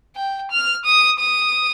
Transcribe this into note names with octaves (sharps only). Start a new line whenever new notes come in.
G5
F6
D#6
D#6